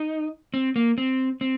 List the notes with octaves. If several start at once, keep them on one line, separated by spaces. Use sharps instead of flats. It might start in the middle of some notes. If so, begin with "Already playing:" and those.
Already playing: D#4
C4
A#3
C4
C4